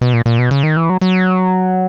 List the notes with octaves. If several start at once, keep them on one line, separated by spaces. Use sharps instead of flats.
B2
A#2
A#2
B2
C#3
D#3
E3
F#3
F#3